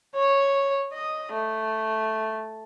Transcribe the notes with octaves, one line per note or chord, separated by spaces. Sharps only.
C#5
D#5
A3